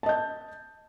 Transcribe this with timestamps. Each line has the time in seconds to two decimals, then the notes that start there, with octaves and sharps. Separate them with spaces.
0.03 A5
0.06 D#5
0.09 G6